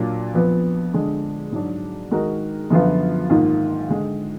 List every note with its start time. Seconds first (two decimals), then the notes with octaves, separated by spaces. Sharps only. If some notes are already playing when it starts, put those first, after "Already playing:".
Already playing: A#2 F#3 A#3 D4 F4
0.34 F2 F3 B3
0.93 D3 G#3 D4
1.52 G#2 F#3 D4
2.11 D#3 G#3 D#4 F#4 A#4
2.70 F#2 D3 F3 B3 F4
3.30 G#2 D#3 A#3 F4
3.89 D3 G#3